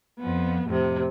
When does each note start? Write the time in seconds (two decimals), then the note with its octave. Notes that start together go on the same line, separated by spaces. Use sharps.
0.19 F2 F3 B3
0.67 F2 A2 C3